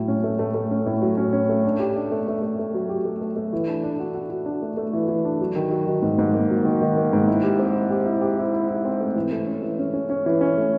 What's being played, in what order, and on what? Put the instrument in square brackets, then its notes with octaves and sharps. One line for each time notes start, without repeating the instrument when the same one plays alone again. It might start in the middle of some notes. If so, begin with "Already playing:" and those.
Already playing: [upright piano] A2 F#3
C#4
A3
A3
A3
C#4
A2
F#3
C#4
C#4
A3
D4
G4
D4
A3
A3
A3
A3
F#3
G4
A3
A3
A3
E3
D4
D4
F#4
F#4
F#4
D4
A3
A3
E3
E3
D4
F#3
D#3
F#3
D#3
G#2
G#2
A#3
F#3
D#3
D#3
A#3
G#2
E4
G4
C4
E4
G4
E4
G4
E4
E4
E4
C4
A3
E3
A3
C#4
E3
C#4
C#4
C#4
E3
C#4
A3